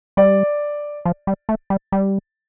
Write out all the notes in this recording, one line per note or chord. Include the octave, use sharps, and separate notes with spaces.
G3 D5
F3
G3
A3
G3
G3